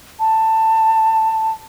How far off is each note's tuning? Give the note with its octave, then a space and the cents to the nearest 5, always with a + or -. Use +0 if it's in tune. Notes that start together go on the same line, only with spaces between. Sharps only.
A5 +15